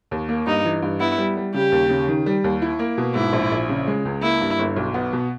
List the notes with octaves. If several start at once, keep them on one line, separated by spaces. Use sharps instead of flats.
D#2
A#3
G2 D#4
E3
G2
B3 E4
G3
G3
C#3 G4
D#2
C#3
D#3
G3
D#2
E4
A#3
B2
G#2 E4
A#1
A#1
C#3
G#3
C#2
A#3 E4
G2
G1
B1
B3
B2